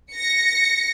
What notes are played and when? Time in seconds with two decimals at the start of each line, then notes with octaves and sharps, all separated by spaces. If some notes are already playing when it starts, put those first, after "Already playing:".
0.12 A#6 C#7